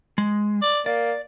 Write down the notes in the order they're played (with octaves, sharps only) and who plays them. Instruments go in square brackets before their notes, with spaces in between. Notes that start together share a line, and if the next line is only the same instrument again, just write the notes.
[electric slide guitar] G#3
[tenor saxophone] D5
[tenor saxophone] A#3 [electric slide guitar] D5